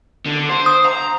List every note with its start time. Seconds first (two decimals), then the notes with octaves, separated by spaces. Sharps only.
0.26 D3
0.49 C5
0.66 D#6
0.85 A#5